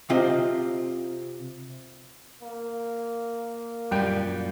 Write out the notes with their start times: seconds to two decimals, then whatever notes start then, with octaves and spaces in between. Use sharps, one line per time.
0.10 C3 C4 F4 D#5
2.43 A#3
3.91 F#2 A#2 G3 G5